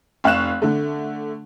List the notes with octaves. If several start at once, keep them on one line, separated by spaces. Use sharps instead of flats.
F1 F5 C#6 F#6 E7
D3 A3